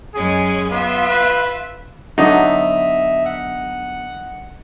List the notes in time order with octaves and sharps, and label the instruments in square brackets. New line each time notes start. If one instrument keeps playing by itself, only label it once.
[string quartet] F#2 G#3 C#4 [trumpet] G#4
[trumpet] B3 [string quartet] F4 E5
[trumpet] B4
[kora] D3 F#3 B3 [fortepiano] D#4 [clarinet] E5
[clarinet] F#5